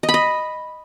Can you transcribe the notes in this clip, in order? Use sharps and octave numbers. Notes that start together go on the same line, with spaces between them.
D#5
B5
D#5